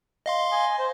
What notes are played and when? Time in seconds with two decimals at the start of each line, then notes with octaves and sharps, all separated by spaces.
0.26 D#5 F5 C6
0.52 G#5
0.78 C5